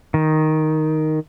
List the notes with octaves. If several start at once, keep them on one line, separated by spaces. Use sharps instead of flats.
D#3